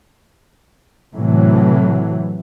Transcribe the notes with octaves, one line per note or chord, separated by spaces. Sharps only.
A2 C3 E3 F#3 A3